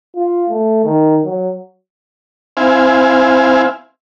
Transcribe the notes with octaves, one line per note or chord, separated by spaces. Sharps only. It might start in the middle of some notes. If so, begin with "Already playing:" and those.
F4
A3
D#3
F#3
C4 E4 F5 G#5